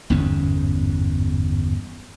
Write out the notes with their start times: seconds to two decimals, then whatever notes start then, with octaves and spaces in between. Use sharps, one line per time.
0.10 G1 E2 G#2 C#4